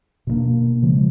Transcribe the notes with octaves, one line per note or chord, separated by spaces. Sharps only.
B2 G3 A#3 D4
C#3 F3 G#3